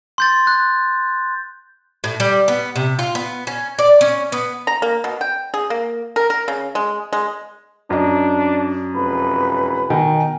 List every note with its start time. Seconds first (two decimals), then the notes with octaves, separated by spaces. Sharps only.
0.18 C6 G6 A6
0.47 F#6
2.04 A2
2.20 G3
2.48 B3
2.76 C3
2.99 F4
3.15 B3
3.47 C#4
3.79 D5
4.01 C#4
4.32 B3
4.67 A#5
4.82 A#3
5.04 B2
5.21 G5
5.54 G#4
5.70 A#3
6.16 A#4
6.30 A#4
6.48 C#3
6.75 G#3
7.13 G#3
7.90 F#2 D4 D#5
8.94 F1 B4 B5
9.90 B2 D#3 G#5